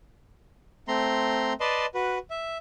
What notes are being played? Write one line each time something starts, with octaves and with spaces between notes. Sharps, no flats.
A3 C4 A#5 C6
B4 D5 D#5 A5 C6
F#4 B4
E5